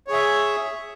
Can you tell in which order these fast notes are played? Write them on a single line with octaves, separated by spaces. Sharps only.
C#5 G#4 E5